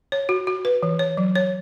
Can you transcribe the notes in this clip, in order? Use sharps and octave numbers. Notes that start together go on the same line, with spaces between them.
C#5
F#4
F#4
B4
E3
C#5
F#3
C#5